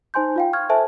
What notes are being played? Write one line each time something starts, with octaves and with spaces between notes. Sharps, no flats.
D#4 C5 G#5 C6 G6
F4 F5 G5
C#6 F6 G#6
A4 C5 E5 G#5 A5